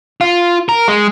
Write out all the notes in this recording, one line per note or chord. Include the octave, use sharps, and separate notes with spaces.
F4
A#4
G#3